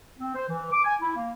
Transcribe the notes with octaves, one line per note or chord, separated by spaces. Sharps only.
C4
C5
E3
D6
G#5
E4
A#3